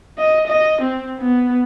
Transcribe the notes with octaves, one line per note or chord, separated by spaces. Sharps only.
D#5
D#5
C4
B3